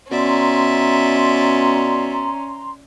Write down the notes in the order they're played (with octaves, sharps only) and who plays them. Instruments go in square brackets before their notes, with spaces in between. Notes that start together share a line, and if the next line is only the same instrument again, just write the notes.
[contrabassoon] B2 [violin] C#4 [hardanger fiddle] D5 E5 [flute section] A#5 C6